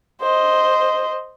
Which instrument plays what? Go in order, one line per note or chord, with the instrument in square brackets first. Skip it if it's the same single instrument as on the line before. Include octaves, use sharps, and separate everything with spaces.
[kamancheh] C5 D#5